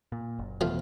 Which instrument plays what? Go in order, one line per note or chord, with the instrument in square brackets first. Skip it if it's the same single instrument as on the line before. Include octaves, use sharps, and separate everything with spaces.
[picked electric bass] A#2
F#1
[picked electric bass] E2 B2 [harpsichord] F3 A3 F4